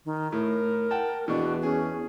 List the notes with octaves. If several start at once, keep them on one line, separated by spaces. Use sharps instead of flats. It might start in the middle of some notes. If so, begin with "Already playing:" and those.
D#3
A2 A#4
F#5 G5 A5
E2 B2 D4 F#4
C#4 G#4